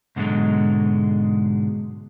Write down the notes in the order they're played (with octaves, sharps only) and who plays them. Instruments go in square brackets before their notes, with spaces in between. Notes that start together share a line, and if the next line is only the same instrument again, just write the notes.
[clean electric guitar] G#2 B2 D3 F3 F#3 G#3